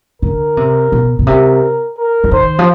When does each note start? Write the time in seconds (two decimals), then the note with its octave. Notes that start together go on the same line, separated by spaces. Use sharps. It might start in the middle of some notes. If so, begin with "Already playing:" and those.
0.22 D3 A#4
0.57 C3
0.92 B2
1.19 B2
1.27 C3 A#4
1.98 A#4
2.24 E3
2.31 D#3 C5
2.59 F3